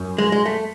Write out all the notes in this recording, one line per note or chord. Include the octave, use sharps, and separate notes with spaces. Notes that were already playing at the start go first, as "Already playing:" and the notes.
Already playing: F#2
G#3
G#3
A3